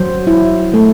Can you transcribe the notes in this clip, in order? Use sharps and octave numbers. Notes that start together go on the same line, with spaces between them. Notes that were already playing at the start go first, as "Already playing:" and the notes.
Already playing: F#3 C5
E4
A3